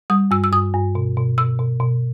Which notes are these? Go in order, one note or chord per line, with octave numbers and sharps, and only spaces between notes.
G3 D#6
G2 E6
E6
G2 D#6
G2
B2
B2
B2 E6
B2
B2